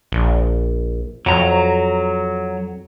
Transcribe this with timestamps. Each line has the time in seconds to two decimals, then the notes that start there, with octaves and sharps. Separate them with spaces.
0.12 A#1
1.26 F2 F#3 A#5